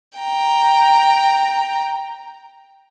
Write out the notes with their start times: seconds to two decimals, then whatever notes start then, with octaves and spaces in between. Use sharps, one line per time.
0.19 G5 A#5